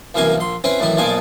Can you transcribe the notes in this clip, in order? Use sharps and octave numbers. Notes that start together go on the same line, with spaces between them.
C2 F#2 E3 A#3 A#4 G#5
A#1 C6
C4 C#4 E4 B4 C5
F#2 A2 D#3 E3 E4
B1 A#2 F3 D#4 D5 G#5